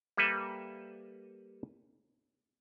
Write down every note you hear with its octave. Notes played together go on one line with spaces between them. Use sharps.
G3 A#3 A4 B4 E5